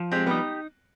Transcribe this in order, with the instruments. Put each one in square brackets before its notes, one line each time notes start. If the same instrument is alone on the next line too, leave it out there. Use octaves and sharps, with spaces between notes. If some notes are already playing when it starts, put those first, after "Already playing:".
Already playing: [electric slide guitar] F3
[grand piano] G#3 C4 [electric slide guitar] G4
[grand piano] G3 B3 [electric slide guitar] D#4